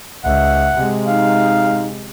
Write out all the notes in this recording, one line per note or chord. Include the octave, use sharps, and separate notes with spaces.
C#2 E5 F#5
C3 G#3
D#4 F5